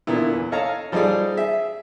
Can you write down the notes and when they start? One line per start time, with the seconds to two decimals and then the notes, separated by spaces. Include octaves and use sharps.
0.07 A#2 D3 B3 E4
0.33 E2
0.52 A4 C#5 D#5 F5 A5 A#5
0.92 F3 G3 D#4 G#4 A4 D5
1.35 G#4 E5